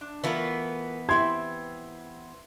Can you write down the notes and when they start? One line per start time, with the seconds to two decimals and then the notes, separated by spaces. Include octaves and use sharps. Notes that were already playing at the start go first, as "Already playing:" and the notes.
0.01 D4
0.24 E3 A3 B3 F4 A#4
1.09 C4 E4 G4 C6 G#6